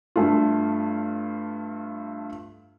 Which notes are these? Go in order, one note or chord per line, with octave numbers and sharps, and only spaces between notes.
G2 A3 F4